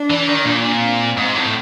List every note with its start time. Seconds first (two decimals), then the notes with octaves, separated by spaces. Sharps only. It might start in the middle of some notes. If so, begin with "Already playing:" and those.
Already playing: D4
0.10 E3
0.28 D#3
0.46 A#2
0.64 C4
1.17 G#2
1.35 A2